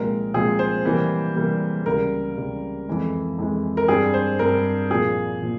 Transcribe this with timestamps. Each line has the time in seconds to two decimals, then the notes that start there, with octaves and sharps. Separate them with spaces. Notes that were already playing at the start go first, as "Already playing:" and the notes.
Already playing: C2 A#2 F3 G#3 C4 A#4
0.34 C2 A#2 F3 G#3 C4 G#4
0.59 C5
0.85 C3 E3 G3 A#3
1.36 C3 E3 G3 A#3
1.86 C#2 C3 G3 A#4
2.37 C#2 C3 G3
2.88 F2 E3 G#3
3.39 F2 E3 G#3
3.77 A#4
3.88 G2 G3 C4 G#4
4.14 C5
4.39 G2 G3 C4 A#4
4.90 C2 A#2 F3 A#3 G#4
5.42 A#2 F3